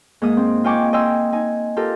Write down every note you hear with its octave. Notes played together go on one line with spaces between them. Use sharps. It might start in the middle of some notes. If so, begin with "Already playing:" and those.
G#2 A#3 D#6
C4
F4 D#5 G5 G#5 C#6 D6
D#5 G5 G#5 C6 E6
D#4 G#5
F4 G4 A4 A#4